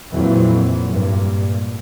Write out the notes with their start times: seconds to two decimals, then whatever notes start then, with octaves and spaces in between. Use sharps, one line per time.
0.12 F2 A#2 E3 F#3
0.92 G2 A#2